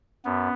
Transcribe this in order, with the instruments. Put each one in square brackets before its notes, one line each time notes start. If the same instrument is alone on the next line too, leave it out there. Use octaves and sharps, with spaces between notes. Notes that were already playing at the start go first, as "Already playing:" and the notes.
[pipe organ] F#2 B3